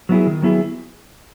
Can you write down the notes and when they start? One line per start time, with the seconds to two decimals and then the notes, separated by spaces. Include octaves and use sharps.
0.09 F#3 B3 E4 G#4
0.27 D#3
0.42 F#3 B3 E4 G#4